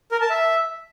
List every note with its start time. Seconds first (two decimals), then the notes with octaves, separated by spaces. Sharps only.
0.12 A#4
0.21 A5
0.30 E5